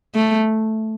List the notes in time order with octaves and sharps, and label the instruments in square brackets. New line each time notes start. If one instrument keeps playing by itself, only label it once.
[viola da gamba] A3